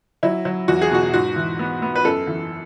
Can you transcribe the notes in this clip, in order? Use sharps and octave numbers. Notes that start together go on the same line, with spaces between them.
F#3 E4
F#3
E2 F#4
G#4
B2 F#4
G#2 F#4
E3
B3
B3
B4
F#2 A4
E3